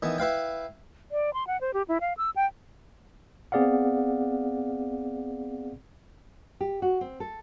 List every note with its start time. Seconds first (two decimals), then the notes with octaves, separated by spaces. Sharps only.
0.02 D#3 E3 B3
0.18 E4 B4 F5 G5
1.11 D5
1.34 C6
1.47 F#5
1.61 C5
1.74 G4
1.88 E4
2.01 F5
2.17 E6
2.36 G5
3.52 B3 C4 G#4 D5 F5 F#5
6.61 G4
6.82 F#4
7.01 C4
7.20 A4